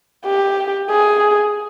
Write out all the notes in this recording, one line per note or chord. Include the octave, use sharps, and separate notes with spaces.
G4
G#4